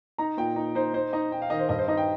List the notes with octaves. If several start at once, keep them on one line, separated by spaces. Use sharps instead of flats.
D#4 A#5
A#2 G5
D#4
D#4 C5
D#4 C5
D#4 D#5
D#4 G5
F5
D#3 D#5
C5
G2 D#5
C5
D#4 D#5
G5